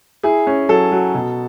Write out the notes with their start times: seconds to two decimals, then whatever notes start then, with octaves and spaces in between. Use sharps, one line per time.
0.23 E4 G#4
0.47 C#4
0.69 F#3 A4
0.92 F#3
1.14 B2